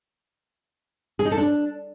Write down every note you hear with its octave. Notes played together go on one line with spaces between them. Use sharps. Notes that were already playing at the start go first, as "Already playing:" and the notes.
G#4
D#4
A4
D4